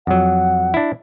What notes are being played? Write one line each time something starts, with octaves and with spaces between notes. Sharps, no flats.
F2 F#3 F#5
D4 E4